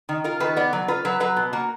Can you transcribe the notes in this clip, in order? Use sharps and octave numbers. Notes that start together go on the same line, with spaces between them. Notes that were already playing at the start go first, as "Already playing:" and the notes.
D#3
F4 A#4
D#3 B4
B3 D5
F#3
F4 B4
F#3 B4
F#3 B4
B2
A#3 F#4